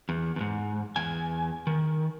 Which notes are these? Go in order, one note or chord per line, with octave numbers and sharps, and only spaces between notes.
E2
E2 G#2
E2 G#5
D#3